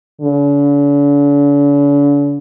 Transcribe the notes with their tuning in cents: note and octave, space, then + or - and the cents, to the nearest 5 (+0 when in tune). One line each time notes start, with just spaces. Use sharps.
D3 -45